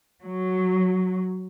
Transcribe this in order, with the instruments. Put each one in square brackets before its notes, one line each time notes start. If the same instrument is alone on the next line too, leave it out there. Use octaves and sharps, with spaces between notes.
[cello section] F#3